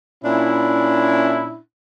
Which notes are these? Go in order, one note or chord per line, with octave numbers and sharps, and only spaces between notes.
A#2 C#4 D4 E4